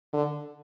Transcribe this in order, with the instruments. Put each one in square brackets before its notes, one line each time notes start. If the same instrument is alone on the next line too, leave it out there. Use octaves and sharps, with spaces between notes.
[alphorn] D3